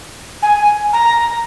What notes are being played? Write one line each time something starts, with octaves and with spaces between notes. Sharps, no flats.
G#5
A#5